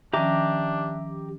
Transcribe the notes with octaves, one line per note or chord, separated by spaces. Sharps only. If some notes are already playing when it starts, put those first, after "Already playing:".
D#3 F3 C#4 D4 G4 E5 A#5 D6